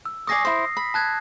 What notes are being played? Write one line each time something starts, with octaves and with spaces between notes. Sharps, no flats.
E6
D5 G#5 C#6 D#6 A#6 C7
E4 C5
B5
A5 F#6 G#6